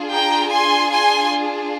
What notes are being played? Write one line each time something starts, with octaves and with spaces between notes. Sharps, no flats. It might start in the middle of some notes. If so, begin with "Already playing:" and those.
Already playing: D4 F4 G#4
G5 A#5
G#5 C6
G#5 C6